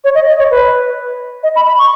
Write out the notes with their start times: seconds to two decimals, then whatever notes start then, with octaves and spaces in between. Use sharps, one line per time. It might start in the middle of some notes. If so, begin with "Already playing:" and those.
0.04 C#5
0.15 D#5
0.27 D#5
0.39 C#5
0.51 B4
1.43 D#5
1.56 B5
1.67 B5
1.78 C#6